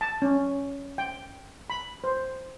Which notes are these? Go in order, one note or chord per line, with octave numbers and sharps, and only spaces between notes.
A5
C#4
G5
B5
C5